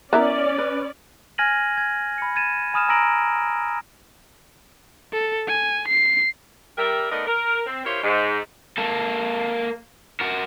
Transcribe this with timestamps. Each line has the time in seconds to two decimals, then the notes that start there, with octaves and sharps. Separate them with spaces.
0.13 B3 C#4 E4 A#4 D5 E5 D6
0.58 B4
1.38 G#5 F6 G#6 A#6 D#7 F#7
1.78 G#6
2.18 B5 C#7
2.36 G#6 A6 D#7 E7
2.74 G#5 B5 D#6 F6 D#7 E7
2.89 G#5 A#5 E6 A#6 D7 F#7
5.13 A4
5.48 G#5
5.88 C7
6.78 G3 A#4 E5
7.12 A3 B3 D#4 A#4 D5 D#5
7.27 A#4
7.67 C4
7.85 E4 F4 G4 A#4 C5 C#5
8.04 G#2
8.78 A#3 A4
10.20 F#4 A#4